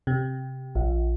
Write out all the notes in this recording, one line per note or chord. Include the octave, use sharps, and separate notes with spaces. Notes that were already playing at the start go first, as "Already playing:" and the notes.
C3
A#1